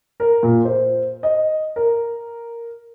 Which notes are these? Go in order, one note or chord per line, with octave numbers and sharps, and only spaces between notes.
A#4
A#2
C5
D#5
A#4